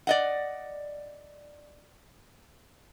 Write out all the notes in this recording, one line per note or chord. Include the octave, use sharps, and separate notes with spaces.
D5 D#5 F#5